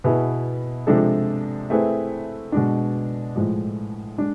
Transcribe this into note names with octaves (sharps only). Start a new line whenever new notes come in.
B2 B3 E4 G#4
C3 F3 G#3 D4 A4
A3 C4 E4 G#4 B4
B2 G#3 D4
A2 F3 G#3
G#3 D4